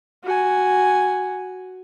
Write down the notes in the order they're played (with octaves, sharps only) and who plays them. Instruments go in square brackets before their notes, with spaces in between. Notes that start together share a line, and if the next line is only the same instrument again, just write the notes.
[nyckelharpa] F#4 G#5